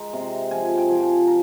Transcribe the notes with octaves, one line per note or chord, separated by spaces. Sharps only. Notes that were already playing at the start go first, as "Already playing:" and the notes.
Already playing: G#3 A#5
C3
F3 G#5
G5
F3
G#5
A#5